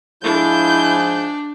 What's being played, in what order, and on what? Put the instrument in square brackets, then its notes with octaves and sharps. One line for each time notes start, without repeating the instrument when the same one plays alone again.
[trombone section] G#2 F3 G#4 [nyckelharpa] D4 [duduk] E4 [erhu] G6